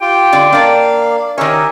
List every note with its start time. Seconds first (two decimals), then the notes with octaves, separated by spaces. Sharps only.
0.01 F4 G4 G5
0.33 D3 D5
0.52 A#3 D4 D5 F5
1.38 D#3 G4 A#4 C#5 E5 G#5